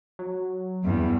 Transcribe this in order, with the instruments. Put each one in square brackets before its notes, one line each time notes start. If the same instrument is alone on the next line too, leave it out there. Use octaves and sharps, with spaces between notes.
[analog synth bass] F#3
[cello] E2 G2